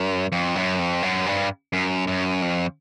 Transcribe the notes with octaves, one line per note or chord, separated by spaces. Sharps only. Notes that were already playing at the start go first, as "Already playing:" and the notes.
Already playing: F#2
F2
F#2
F2
F#2
G2
F#2
F#2
F2